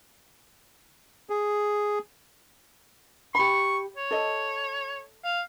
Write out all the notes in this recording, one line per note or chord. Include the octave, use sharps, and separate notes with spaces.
G#4
G4 B5 C#6
C#5
A4 D#5
F5